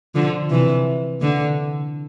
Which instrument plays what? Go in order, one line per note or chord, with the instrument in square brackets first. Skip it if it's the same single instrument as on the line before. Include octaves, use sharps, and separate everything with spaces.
[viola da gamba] D3 F3
C3 E3
D3